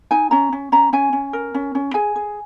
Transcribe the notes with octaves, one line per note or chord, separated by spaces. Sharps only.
D#4 G#5
C#4 A#5
C#4
C#4 A#5
C#4 G#5
C#4
A#4
C#4
C#4
G#4 G#5
G#4